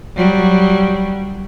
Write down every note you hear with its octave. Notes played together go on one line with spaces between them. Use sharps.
F#3 G3